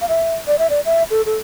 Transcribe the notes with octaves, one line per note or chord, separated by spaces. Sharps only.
F5
E5
D5
E5
D5
E5
A4
A4